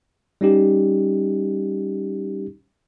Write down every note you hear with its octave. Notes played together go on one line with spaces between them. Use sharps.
G3 C#4 D#4 G4